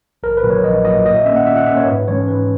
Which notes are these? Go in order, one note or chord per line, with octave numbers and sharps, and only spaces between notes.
A#1 A#4
B4
A#2 F#3
C#5
A#1 D#5
A#2 F#3 D#5
A#2 D#5
E5
A#3 C#4 E5
F#5
A#2 E5
F#5
A#3 C#4 E5
C#5
G#2 B4
E3 G#3 C#4 C#5
G#2 B4